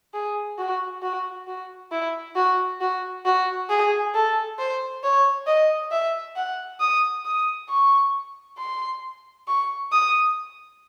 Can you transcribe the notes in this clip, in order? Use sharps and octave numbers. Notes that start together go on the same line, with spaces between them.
G#4
F#4
F#4
F#4
E4
F#4
F#4
F#4
G#4
A4
C5
C#5
D#5
E5
F#5
D#6
D#6
C#6
C6
C#6
D#6